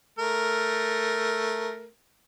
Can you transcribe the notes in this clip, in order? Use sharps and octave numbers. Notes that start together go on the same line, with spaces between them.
A3 A#4